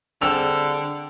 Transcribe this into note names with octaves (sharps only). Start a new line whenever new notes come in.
D3 G3 C4 G#4 E6 F7